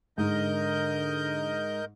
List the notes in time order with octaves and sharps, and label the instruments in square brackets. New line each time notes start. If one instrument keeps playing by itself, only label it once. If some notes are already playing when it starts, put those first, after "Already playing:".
[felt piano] G#2 [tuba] D3 [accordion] A#4 D#5 G6